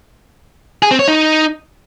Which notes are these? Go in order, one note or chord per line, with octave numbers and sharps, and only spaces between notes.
G#4
C4
C#5
D#4